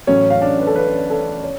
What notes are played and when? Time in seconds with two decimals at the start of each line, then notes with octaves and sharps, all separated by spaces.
0.07 A1 A2 F#3 C#4 C#5
0.30 F5
0.42 D4 D5
0.59 B4
0.67 A4
0.75 B4
1.10 A4
1.44 C#5